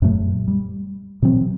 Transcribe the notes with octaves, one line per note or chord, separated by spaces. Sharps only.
F#2 A#2 F#3 A3
G3
B2 E3 F#3 C4